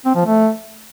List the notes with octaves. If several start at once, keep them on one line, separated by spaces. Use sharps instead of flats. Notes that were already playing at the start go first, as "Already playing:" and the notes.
C4
F3
A3